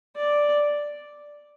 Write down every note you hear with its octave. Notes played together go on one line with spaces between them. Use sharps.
D5